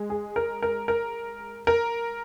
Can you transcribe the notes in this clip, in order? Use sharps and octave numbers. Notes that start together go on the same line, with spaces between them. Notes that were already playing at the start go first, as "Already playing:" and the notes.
Already playing: G#3
G#4
A#4
A#4
A#4
A#4